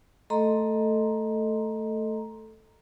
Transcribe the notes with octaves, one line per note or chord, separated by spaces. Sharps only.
A3 A4 D#5 A#5 C6